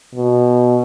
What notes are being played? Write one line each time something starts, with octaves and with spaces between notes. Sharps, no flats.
B2